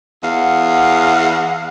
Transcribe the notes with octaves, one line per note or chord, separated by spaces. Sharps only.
E2 F5 F#5